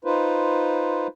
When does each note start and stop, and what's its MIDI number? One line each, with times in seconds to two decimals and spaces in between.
0.05 1.07 63
0.05 1.07 65
0.05 1.07 71
0.05 1.07 72